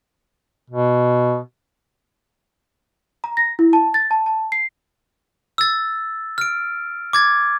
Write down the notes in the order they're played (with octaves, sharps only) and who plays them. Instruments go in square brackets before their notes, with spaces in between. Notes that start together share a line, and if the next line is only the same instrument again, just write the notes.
[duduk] B2
[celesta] A#5
A#6
E4
A5
A6
A5
A5
C7
[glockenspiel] E6 A6
F6 D7
D6 G#6 A6